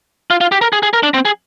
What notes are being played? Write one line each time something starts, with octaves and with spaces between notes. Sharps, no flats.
F4
F4
G4
A#4
G#4
G#4
A#4
D4
C4
G#4